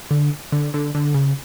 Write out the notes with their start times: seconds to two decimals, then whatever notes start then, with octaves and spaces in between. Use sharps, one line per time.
0.11 D3
0.52 D3
0.74 D3
0.95 D3
1.14 C#3